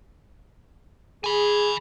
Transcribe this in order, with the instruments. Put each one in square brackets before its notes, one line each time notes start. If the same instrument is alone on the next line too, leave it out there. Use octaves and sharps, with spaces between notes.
[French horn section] G#4 [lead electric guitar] G#5 B5